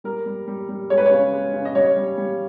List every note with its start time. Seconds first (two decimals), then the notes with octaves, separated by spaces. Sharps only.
0.04 G3 A#4
0.26 G3
0.47 G3
0.69 G3
0.90 G#3 C#5
0.98 B4
1.06 C#3 C#5
1.33 G#3
1.54 C#3
1.65 D#5
1.75 G3 C#5
1.96 G3
2.18 G3